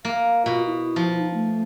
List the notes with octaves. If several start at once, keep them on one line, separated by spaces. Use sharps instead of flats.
A#3 F5
B2 F4
E4
F3
D#4
A3